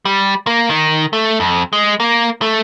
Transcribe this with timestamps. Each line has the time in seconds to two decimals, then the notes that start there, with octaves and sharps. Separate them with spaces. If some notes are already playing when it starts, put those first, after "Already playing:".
0.05 G3
0.47 A#3
0.69 D#3
1.13 A3
1.40 F2
1.73 G#3
2.00 A#3
2.42 A3